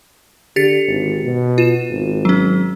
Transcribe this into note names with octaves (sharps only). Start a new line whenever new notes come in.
D3 G4 A6 C#7
G#1
B2
F4 E7
G#1
F#3 C#4